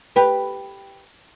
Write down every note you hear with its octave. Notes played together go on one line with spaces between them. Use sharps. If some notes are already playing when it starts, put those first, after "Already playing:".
G4 B4